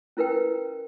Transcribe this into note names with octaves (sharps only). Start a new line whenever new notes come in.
C#4 E4 A#4 B4 G5